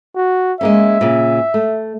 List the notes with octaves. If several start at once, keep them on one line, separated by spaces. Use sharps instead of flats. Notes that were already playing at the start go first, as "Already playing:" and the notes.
F#4
G#3 A#3 C#4 E5
A#2 C#3
A3